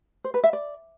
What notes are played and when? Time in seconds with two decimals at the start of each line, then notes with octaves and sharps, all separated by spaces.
0.24 C5
0.34 B4
0.43 E5
0.53 D5